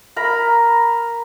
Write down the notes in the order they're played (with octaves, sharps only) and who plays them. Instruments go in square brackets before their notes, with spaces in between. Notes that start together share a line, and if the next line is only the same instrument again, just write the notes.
[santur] A#4 A#5 B5